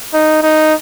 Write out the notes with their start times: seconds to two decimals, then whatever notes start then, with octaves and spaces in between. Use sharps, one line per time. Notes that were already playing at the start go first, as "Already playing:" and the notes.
0.14 D#4
0.43 D#4